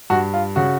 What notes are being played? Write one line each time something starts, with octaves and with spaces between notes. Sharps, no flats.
G2 F#4
F4
C#3 F#4